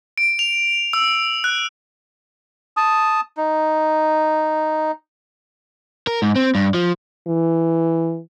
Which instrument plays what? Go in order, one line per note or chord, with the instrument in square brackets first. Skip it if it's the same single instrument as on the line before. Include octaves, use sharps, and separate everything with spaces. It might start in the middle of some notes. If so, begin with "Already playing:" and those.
[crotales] D7
F7
E6
F#6
[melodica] A5 D#6
D#4
[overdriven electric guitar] A#4
G#2
C4
G2
F3
[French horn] E3